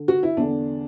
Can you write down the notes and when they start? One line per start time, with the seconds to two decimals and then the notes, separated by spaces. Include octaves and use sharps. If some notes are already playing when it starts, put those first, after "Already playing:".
Already playing: D3
0.08 F#4
0.23 E4
0.37 E2 D3 D4